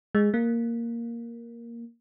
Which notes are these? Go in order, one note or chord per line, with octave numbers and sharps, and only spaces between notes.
G#3
A#3